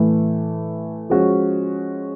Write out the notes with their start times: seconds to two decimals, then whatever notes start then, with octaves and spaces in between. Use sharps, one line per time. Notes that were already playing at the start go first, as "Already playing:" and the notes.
Already playing: A2 E3 A3
1.10 F3 G#3 C#4 F#4